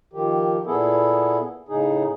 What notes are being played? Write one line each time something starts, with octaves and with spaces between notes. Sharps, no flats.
D#3 F3 G4
A#2 B3 E4 G#4 A4
A2 C#3 D#4 G#4